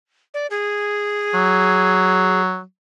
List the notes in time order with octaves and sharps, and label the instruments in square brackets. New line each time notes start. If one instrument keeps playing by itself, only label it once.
[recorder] D5
G#4
[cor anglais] F#3